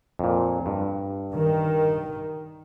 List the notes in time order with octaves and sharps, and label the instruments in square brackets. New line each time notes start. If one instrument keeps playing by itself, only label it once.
[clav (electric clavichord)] F2 A#2
G2
[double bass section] D#3